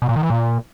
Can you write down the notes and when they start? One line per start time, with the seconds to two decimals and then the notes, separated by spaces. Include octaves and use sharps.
0.02 B2
0.09 A#2
0.16 D#3
0.23 E3
0.30 A#2